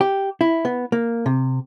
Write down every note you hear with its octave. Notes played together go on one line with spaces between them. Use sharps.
G4
E4
B3
A#3
C3